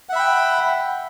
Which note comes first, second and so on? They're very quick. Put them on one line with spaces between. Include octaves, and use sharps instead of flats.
F#5 E5 B5 G5